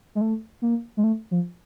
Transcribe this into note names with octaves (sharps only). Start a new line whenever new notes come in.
G#3
A3
A#3
G#3
A3
F3